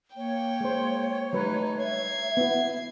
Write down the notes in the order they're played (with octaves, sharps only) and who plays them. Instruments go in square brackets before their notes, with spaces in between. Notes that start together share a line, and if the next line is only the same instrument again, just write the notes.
[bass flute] A#3 [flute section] C#5 [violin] G5
[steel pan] G#3 C5
[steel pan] F#3 G3 B4 [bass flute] A3 [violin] D#4
[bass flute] E5 [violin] G#6 C7
[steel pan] B3 E4